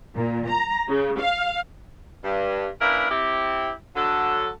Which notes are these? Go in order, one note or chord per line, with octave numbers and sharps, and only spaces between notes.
A#2
A#5
C#3
F5
G2
A#3 C#4 D4 E4 A#4 B4
C4 E4 G4
D3 F#3 A4